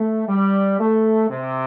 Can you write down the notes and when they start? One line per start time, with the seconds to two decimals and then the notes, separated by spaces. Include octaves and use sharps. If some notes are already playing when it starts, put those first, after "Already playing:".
Already playing: A3
0.29 G3
0.79 A3
1.30 C3